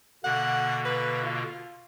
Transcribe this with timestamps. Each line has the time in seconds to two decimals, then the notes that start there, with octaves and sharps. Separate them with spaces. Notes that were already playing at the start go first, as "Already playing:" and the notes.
0.24 B2 D3 A#3 F#5
0.85 B4
1.23 F4